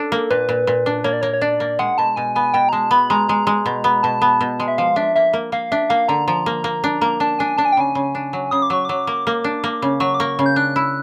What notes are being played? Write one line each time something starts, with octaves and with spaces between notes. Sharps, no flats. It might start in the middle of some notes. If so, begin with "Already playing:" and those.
Already playing: D4 A4
A#3
A#2 B4
A#2
A#2
D4
A#3 C#5
D5
A#3 C#5
C#5
D4 D5
A#3
G#3 F#5
B2 A5
B2 G#5
B3 G#5
B2 G5
A#5
G#3 A5
B3 B5
G#3 A#5
G#3 A#5
G#3
B2
B3
B2 A5
B3
B2
G#3
E5
F3 F5
D4 E5
A#3 E5
A#3
A#3 F5
D4 E5
A#3 F5
D3 A#5
F3 A#5
A#3
A#3
D4
A#3 A#5
D4 A5
D4 G#5
D4 A5
G#5
G5
C#3 G#5
C#3
D4
F#3
C#3 D#6
D6
F#3 C#6
F#3 D6
A#3
A#3
D4
A#3
C#3
F#3 C#6
D6
A#3 C#6
C#3
G6
D4 F#6
E4